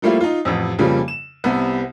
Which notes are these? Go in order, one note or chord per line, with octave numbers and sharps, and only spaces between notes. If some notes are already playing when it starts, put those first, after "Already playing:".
F3 G3 A3 A#3 E4 F4
D#4 F4
A1 F2
F2 C#3 F3 G3 A#3
E7
C2 C3 B3